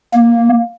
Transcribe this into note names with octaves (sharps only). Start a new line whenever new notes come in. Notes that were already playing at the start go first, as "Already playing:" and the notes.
A#3